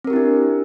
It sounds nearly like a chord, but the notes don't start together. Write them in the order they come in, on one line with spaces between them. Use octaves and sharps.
C4 A#4 G4 E4 D4